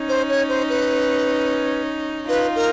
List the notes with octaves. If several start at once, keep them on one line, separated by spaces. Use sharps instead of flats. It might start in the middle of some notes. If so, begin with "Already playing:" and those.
Already playing: C#4 D#4
C5
C#5
C5
B4
D#4 F4 B4
A#4